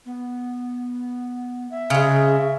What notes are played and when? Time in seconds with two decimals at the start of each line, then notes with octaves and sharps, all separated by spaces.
0.06 B3
1.71 E5
1.90 C#3 G#3